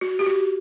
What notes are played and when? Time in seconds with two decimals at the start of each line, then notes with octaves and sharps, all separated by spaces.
0.01 F#4
0.19 G4
0.26 F#4